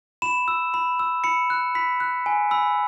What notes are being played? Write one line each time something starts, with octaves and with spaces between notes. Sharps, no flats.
B5 E7
E6
B5
E6
B5 C#7
F#6
B5 B6
F#6
G#5
B5 E6